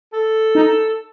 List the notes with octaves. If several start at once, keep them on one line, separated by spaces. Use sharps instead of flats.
A4
D#4